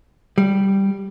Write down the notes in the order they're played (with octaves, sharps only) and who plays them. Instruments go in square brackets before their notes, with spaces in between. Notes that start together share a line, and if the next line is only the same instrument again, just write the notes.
[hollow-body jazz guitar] G3